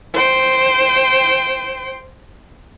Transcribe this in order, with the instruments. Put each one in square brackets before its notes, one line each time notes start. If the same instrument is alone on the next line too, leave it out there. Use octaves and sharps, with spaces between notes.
[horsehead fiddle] C5 G5